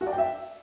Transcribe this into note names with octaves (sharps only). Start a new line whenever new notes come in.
F#4
D5
G5
E5